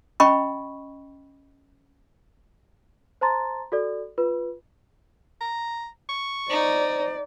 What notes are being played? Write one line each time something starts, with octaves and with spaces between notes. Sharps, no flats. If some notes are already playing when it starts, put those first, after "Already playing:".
C#4 D#5 G5 B5 C#6
C5 A5 A#5 C6 A6
F#4 A4 D5
F4 B4
A#5
C#6
D#4 C5 D5